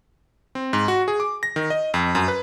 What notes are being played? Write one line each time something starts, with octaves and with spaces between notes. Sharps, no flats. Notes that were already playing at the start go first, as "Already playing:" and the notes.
C4
G#2
F#4
G#4
D6
A#6
D#3
D#5
F2
F#2
B4